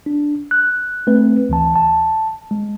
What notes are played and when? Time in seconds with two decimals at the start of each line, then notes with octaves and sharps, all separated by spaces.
0.06 D4
0.51 F#6
1.07 A3 C4 B4
1.49 D2 E3 A5
1.76 A5
2.51 G#3